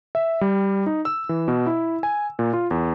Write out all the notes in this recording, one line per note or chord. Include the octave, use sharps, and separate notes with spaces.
E5
G3
D#4
E6
E3
B2
E4
G#5
A#2
F4
E2